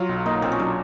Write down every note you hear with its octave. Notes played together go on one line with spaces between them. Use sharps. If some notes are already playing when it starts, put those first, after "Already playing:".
Already playing: F#3 F4
B1
A#3 D#4
A#2 C4
C#4
F#3 D4